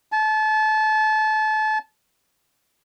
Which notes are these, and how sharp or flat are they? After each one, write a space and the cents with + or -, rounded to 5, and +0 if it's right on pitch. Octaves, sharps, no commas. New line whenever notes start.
A5 -30